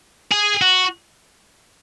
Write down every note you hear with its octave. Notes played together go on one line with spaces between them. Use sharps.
G#4
F#4